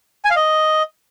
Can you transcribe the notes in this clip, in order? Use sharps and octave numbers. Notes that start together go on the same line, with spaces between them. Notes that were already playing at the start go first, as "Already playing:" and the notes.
G#5
F5
D#5